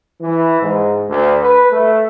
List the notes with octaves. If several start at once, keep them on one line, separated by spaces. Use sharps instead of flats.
E3
G#2
D2
B4
A3